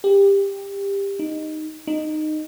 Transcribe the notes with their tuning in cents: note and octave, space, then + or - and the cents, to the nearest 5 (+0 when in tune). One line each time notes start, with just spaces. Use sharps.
G4 +20
D#4 -5
D#4 -15